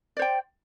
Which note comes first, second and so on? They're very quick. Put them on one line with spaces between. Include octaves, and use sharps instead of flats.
D5 C5 G5